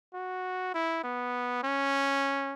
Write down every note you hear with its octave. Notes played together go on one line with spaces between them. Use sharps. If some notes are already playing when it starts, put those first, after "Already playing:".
F#4
E4
B3
C#4